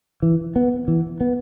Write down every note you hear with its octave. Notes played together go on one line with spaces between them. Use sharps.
E3
B3
E3
B3